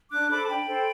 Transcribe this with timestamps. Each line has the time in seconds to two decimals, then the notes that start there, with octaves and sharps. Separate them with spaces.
0.11 D4 D6 F#6
0.29 A4 C5 B5 D6
0.42 A5
0.48 D4 G5 B5
0.67 A4 C5